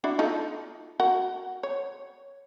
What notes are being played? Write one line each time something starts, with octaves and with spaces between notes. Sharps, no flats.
D4 E4 F#4
D#4 F4 A4
F#4 A#4 F#5
C#5